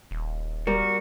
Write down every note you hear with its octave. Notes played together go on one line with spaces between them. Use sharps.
D#1
G3 F#4 A#4